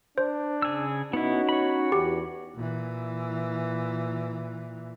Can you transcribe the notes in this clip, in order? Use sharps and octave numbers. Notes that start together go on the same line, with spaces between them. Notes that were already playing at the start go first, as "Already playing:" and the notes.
D4 C5
C#3 G#4 E6
B3 C#4 D#4 E4 F#4
C#5 B5
E2 E3 G4
A#2 E3